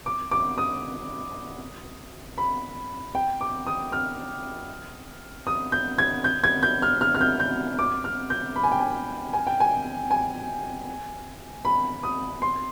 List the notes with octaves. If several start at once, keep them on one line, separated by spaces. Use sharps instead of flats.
D6
D6
D#6
B5
G5
D6
D#6
F6
D#6
G6
G#6
G6
G#6
G6
F6
F6
F6
G6
G6
D6
F6
G6
B5
G#5
G5
G#5
G#5
G5
G#5
G#5
B5
D#6
C6